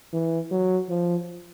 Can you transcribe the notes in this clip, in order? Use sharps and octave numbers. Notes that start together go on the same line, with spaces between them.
E3
F#3
F3